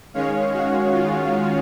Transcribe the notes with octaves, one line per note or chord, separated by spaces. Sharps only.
D#3 G#3 C#4 C#5 F5
F#4
F4